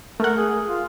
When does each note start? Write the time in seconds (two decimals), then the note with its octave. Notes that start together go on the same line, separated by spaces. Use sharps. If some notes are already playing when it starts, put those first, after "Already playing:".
0.20 A3 A#4 F#5
0.36 G#4
0.67 F4